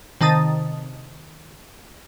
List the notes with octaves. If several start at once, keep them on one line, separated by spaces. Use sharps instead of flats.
C3 D#3 A5 D#6 A6